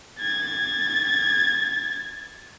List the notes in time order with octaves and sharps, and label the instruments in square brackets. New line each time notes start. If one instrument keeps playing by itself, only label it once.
[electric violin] G#6 A6